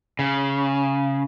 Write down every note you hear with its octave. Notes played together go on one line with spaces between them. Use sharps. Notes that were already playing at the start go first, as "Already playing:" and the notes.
C#3